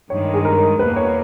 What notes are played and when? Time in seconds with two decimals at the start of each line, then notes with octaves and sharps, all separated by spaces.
0.10 G2 D#3 G#3 C#5
0.34 G#4
0.45 A#4
0.79 E2 B2 A#3 B4
0.96 C#5